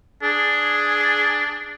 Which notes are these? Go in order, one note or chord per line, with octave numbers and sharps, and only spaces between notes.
D4 G#4